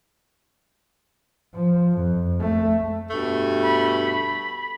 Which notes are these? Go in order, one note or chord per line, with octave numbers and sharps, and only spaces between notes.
F3
F2
A3
G2 B2 A3
B5